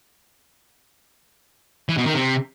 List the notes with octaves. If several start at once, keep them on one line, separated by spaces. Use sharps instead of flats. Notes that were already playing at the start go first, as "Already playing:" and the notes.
E3
B2
D#3
C3